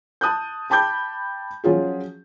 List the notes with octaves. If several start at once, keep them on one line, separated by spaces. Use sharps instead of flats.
A5 D#6 F#6 G6
G5 A5 B5 D6 G6
F3 F#3 C#4 F4 G#4